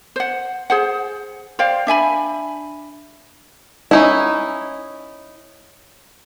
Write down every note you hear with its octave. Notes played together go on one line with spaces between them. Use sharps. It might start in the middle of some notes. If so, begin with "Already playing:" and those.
C5 F#5
G#4 C5 F#5
C5 D5 F5 G5
D4 E5 G#5 B5
C#4 D#4 E4